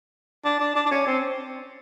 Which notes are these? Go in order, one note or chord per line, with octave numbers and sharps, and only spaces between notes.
D4
D4
D4
D4
C#4
C4